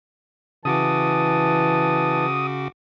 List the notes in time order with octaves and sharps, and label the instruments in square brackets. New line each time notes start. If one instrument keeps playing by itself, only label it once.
[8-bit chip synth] C#3 F#4 D6 [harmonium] E3 A5 [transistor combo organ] D#6